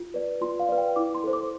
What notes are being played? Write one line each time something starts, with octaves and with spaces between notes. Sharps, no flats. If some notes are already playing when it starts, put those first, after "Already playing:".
Already playing: F4
B4 D5
F4 C6
F5
B4 D5
G5
E4 D6
C6
A4 C5
D6